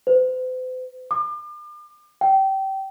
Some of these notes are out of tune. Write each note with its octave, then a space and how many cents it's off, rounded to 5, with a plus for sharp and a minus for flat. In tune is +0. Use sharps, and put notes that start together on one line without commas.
C5 -45
D6 +40
G5 -25